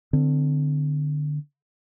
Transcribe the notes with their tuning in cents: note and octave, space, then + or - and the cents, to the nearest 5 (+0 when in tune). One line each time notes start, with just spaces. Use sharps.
D3 +15 C4 -25